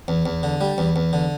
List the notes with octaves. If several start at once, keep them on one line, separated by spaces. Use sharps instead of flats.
E2
E2
D3
G3
E2
E2
D3